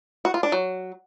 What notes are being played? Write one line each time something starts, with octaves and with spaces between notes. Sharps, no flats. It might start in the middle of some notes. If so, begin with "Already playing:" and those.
F#4
F4
D4
F#3